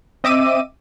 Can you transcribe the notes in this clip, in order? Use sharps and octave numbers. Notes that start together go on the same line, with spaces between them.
C4 D#5 E5 D6 E6 D#7